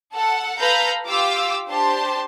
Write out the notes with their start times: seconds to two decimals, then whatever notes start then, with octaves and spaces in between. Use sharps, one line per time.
0.13 A4 F#5
0.59 A4 B4 F5 A#5 B5 G6
1.07 F4 G4 F5 D6 E6
1.68 D4 G4 C5 A5 C6